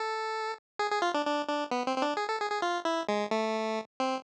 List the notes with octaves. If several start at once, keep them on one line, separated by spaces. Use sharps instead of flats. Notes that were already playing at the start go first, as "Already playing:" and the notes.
Already playing: A4
G#4
G#4
F4
D4
D4
D4
B3
C4
C4
D4
G#4
A4
G#4
G#4
F4
E4
G#3
A3
C4